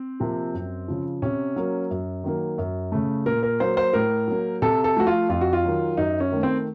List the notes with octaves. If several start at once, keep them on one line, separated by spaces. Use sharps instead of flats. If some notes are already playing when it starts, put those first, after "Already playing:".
Already playing: C4
C3 F3 A#3
F#2
C#3 F3
C3 C#4
F#3 A#3
F#2
D#3 F#3 A#3
F#2
C#3 A3
A#2 A#4
A#4
F#3 A#3 C5
C5
A2 A#4
F#3 A#3
C3 A4
A4
F3 A3 F#4
F4
F2 F4
F#4
F4
D#3 F#3
F#2 D#4
C#4
D#3 A3
C4